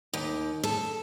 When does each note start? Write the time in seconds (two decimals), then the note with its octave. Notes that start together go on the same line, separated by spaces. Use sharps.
0.14 D#2
0.64 A4